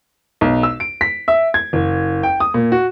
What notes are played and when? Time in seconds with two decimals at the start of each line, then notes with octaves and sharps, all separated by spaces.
0.41 B1
0.63 E6
0.80 D7
1.01 B6
1.28 E5
1.54 G#6
1.73 F#1
2.23 G5
2.40 D#6
2.54 A#2
2.72 F#4